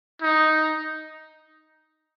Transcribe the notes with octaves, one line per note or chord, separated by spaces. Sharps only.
D#4